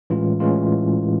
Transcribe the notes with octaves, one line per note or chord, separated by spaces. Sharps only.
A2 E3 G#3 C#4 F4
A2 E3 G#3 C#4 F4